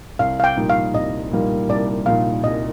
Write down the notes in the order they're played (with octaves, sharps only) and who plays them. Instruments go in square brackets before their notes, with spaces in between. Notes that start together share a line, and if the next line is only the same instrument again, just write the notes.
[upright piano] C2 [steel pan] F5
[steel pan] F5
G5
[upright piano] A#2 G3 A#3 D#4
[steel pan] F5
[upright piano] C2 [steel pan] D#5
[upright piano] A#2 G3 A#3 D#4
[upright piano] C2 [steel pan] D5
[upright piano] A#2 G3 A#3 D#4 [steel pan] F5
[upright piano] C2 [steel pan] D#5